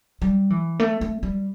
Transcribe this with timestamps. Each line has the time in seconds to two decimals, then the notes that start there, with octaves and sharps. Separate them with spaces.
0.22 G3
0.50 E3
0.80 A3
1.01 A3
1.23 G3